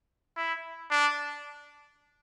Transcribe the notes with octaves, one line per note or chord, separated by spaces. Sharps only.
E4
D4